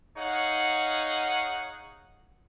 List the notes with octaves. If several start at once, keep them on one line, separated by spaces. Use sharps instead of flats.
D#4 G#4 C#5 F5 F#5